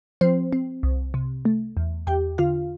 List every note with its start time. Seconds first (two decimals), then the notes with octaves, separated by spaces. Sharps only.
0.21 F3 C4 C5
0.53 C4
0.83 C2
1.14 C3
1.45 A3
1.77 E2
2.07 E2 G4 G5
2.38 D3 F4 F5